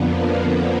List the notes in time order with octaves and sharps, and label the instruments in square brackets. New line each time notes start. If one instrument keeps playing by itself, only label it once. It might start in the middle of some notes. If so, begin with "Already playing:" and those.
Already playing: [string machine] F2 D3 F3 A#3 B3
B3